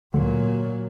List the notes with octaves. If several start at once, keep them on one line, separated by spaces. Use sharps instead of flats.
D2 A#2 F#3